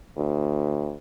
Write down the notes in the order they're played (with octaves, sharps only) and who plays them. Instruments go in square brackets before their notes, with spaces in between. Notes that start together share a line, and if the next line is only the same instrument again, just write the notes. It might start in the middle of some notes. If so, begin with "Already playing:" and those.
[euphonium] D2